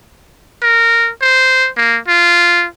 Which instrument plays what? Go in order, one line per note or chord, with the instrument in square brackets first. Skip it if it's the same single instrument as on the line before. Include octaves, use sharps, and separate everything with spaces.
[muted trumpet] A#4
C5
A#3
F4